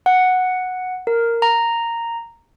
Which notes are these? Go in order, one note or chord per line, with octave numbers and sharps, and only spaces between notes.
F#5
A#4
A#5